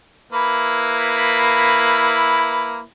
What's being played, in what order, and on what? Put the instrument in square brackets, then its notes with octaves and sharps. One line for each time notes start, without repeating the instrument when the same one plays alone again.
[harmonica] A#3 E4 B4